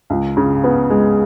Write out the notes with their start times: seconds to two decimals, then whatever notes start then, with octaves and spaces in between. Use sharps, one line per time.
0.10 C#2
0.37 C#3
0.64 B3
0.90 G#3